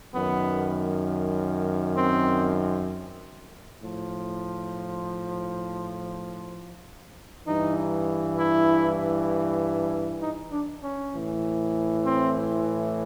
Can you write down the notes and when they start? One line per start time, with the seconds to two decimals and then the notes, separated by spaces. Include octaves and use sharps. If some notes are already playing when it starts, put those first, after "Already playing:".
0.14 F#2 D#3 B3
1.96 C4
3.80 A2
3.85 F3
7.46 G2 E3 D#4
8.39 E4
10.22 D#4
10.52 D4
10.83 C#4
11.13 A2 E3
12.05 C4